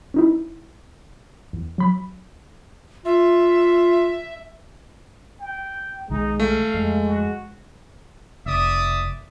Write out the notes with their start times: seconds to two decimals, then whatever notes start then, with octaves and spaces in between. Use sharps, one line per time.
0.14 C#4 D#4 E4
1.53 E2
1.78 F#3 B5
3.05 F4 E5
5.40 G5
6.10 B1 D#3 G#3 D#4
6.40 A3 F5
6.74 F2 G#3
7.06 F#4
8.46 F1 D5 E5 D#6